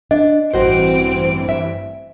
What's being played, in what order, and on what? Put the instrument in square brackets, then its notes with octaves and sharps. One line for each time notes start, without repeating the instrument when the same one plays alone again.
[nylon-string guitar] D4 [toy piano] D#5
[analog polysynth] A1 G2 E3 [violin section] C4 D7 [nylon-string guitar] F#4 C5
[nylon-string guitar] E5